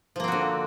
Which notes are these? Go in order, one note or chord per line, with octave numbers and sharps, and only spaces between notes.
D3 F3 A#3 C4 F#4